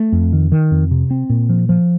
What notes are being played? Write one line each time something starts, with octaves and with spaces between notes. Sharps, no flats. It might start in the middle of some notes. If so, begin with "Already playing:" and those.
Already playing: A3
F2
D#3
D#3
F2
C3
C4
A#2
F3
F3